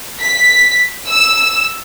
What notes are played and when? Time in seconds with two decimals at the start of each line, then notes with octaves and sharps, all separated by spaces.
0.21 B6
1.08 E6